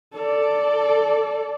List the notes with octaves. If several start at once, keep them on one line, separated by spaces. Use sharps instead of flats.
A4 D5